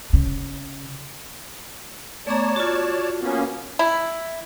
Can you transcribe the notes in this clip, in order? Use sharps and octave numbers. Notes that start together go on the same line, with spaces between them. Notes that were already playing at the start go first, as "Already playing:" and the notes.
C#3
A3 B3 C#5 D5 A5 A#5
F4 F#4
A#3 B3 C#4
E4